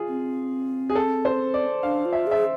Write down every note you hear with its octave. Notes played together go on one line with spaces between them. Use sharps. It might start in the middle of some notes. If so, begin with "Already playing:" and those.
Already playing: F4 G#4
C4
G#4
A4
C5
D5
D4 F5
F4
E5
G#4 E5